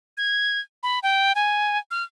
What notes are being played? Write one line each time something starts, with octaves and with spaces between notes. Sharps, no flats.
G#6
B5
G5
G#5
F6